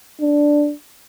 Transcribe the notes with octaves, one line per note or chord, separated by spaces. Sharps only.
D4